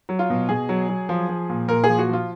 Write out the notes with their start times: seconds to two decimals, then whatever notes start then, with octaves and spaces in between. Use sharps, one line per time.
0.09 F#3
0.19 F4
0.30 B2
0.49 B2 G#4
0.69 F#3
0.89 F#3
1.09 F3
1.29 F3
1.49 A#2
1.68 A#2 A#4
1.84 F3 G#4
1.99 F#4
2.09 F3 F4